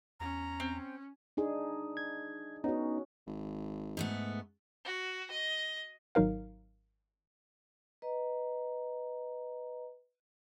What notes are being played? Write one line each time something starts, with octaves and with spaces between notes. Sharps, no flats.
E2 C#4 A#5
C4
D4 D#4 G#4
G#6
B3 C#4 D#4 F#4
G#1
G#2 A3 B3
F#4
D#5
G#1 F#3 D#4 A#4 F5
B4 D#5 A#5